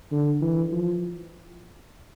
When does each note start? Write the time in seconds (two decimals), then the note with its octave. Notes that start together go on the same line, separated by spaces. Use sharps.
0.11 D3
0.42 E3
0.72 F3